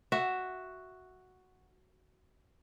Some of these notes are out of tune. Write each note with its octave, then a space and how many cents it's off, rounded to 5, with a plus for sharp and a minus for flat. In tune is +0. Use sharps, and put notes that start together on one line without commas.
F#4 +0 E5 +0